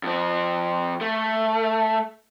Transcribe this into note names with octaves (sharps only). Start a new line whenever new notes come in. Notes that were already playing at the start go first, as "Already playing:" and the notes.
F2 C4
A3